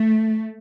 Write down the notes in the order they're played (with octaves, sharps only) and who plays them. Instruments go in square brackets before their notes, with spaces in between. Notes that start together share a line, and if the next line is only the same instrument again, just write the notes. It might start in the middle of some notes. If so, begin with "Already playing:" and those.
Already playing: [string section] A3